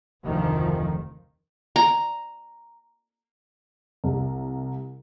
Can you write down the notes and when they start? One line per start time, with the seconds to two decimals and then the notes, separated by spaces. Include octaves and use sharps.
0.24 F1 D2 D#3 F3
1.76 A#5
4.04 C2